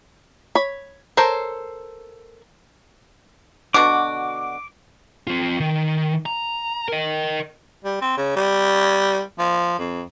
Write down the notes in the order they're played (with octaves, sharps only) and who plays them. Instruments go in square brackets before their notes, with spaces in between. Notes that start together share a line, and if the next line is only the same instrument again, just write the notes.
[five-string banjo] C#5 B5
A4 A#4 C5 C#5
[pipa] B2 D3 F#4 [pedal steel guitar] D6
[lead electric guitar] C4 F4
D#3
A#5
A#4 D#5
[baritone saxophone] G3
C4
C#3
G3
F3
F2